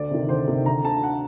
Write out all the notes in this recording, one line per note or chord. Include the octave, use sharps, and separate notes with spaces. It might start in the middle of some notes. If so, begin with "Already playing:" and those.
Already playing: D2 D5
C3 D#3
D2 C5
C3 D#3
D2 A#5
D3 A5
F#5